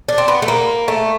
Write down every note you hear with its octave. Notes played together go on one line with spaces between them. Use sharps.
D4
C4
B3
A3
A#3
A3